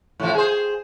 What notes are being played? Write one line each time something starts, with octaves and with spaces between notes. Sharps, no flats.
A2 C3 F3
G#4 C5